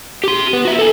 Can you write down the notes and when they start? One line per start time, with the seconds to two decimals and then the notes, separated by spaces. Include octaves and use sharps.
0.24 G4 C6
0.53 B3
0.65 F#4 E5
0.79 A4 G#5